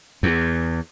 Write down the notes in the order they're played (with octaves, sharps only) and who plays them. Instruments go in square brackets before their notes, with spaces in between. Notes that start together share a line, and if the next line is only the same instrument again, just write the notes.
[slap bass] E2